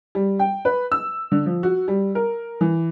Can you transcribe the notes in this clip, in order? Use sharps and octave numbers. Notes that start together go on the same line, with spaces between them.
G3
G5
B4
E6
D3
F3
F#4
G3
A#4
E3